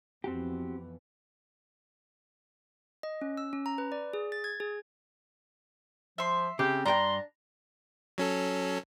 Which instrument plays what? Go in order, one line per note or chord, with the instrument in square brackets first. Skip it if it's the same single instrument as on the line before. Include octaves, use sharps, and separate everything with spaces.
[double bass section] F2 E3 B3 [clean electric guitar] C4 F#4 G4
[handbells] D#5
C#4
E6
C#4
A#5
B4
D5
G#4
A6
G#6
G#4
[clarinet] F3 [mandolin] E5 C6
[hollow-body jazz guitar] C#3 [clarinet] C4 [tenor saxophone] G4
[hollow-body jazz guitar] G2 G4 G5 [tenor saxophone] D4 [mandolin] A#5 [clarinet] C6
[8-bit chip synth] F#3 C#4 A4